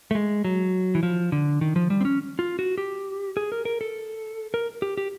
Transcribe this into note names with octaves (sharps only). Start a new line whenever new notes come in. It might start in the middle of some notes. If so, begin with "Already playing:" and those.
A3
G#3
F#3
E3
F3
D3
D#3
F3
G3
C4
C#4
F4
F#4
G4
G#4
A#4
A#4
A4
A#4
G4
G4